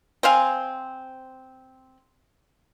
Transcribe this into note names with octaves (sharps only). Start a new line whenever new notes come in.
C4 C5 F5 G#5